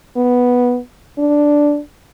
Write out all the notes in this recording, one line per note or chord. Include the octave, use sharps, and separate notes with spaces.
B3
D4